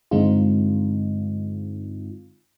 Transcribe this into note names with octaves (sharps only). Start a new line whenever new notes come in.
G2 D3 G#3 C4 D#4 F4